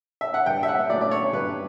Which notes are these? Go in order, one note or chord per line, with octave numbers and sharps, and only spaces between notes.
E5
F#5
G2 G5
E5
F#5
F#3 A3 D5
D5
C#5
G2 B4